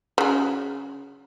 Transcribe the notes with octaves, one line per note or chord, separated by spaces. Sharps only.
C#3 F#3